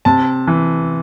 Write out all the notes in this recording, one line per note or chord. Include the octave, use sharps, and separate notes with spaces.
C3 A5
E3